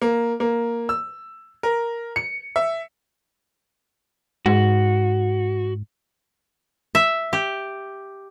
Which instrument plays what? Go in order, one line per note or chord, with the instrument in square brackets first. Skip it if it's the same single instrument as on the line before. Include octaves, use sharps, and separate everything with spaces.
[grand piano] A#3
A#3
E6
A#4
C#7
E5
[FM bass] G#2 [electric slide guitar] F#4
[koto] E5
G4